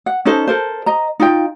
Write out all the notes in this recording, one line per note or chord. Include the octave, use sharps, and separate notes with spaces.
F#5
C#4 D#4 A4 C5
A4 A#4 C5
D#5 A#5
D#4 F4 G5